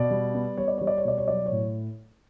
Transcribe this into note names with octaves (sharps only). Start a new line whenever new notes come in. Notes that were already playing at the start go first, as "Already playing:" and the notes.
Already playing: B2 D5
G3
B3
G3 C#5
D5
G3 C#5
D5
C#5
B2 D5
C#5
F#3 D5
C#5
A2